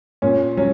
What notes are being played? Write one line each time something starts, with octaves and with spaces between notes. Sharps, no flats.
A#2 C#4
F#3 C#4